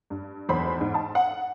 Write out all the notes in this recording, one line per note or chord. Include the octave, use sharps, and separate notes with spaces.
G2
B1 E2 C5 B5
G#2
A5
F#5